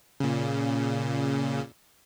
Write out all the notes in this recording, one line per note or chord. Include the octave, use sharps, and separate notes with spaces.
A#2 C#3